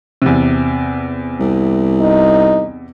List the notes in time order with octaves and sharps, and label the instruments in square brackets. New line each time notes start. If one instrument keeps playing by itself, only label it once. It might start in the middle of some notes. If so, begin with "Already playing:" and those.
[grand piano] E2 C3
[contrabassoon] C2
[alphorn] D#4